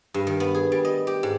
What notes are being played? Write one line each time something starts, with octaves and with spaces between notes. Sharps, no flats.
G2
D#3
B3
G#4
G3
D#5
G4
G#2